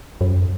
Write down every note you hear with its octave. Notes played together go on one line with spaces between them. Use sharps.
F#2